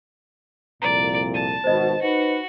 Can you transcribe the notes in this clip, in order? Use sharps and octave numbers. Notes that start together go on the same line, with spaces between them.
C2 F2 A#2 D5 A#5
A5 D#7
G#1 B2 C5 D#5
D#4 F#4 B4